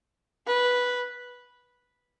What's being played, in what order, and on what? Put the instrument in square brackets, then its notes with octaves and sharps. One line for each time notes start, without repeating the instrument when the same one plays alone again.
[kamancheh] B4